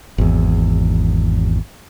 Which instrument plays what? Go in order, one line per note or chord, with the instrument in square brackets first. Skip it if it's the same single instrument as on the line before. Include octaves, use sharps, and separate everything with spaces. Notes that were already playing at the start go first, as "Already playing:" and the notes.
[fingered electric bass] G#1 E2